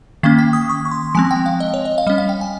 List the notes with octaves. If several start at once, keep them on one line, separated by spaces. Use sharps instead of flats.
D#3 A#3 C#4 F5
G5
D#6
C#6
C#6
C6
F3 G#3 C4 G#5
G5
F5
D#5
C#5
D#5
F5
G3 C#4 D#5
F5
G5
G#5